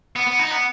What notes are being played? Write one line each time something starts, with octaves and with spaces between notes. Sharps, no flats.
B3
B3
D#4
B3